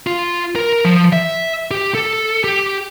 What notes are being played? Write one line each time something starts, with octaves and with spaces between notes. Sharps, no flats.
F4
A#4
F3
E5
G4
A4
G4